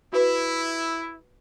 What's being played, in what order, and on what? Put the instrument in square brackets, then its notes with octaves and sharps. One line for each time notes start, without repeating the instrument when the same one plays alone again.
[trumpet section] E4 [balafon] F#4 B4